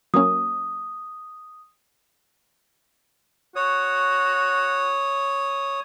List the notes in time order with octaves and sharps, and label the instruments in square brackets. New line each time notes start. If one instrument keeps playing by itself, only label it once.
[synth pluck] F#3 A#3 C#4 [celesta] D#6
[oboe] F#4 [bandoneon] C#5 D#6